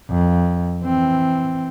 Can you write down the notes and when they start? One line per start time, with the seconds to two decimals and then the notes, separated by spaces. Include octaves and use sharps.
0.10 F2
0.82 E3 C4